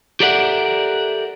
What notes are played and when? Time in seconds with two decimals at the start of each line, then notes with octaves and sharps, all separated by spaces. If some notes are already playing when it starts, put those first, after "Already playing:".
0.20 G4 A4 A#4 D5 E5 F#5